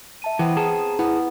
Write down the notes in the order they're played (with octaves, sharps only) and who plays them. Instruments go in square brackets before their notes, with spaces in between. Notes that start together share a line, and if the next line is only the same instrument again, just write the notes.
[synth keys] E5 A5 D#7
[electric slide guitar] E3 [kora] B3 C4
[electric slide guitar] G#4 A5 A#5 [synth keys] D#6
[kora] B3 [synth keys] E4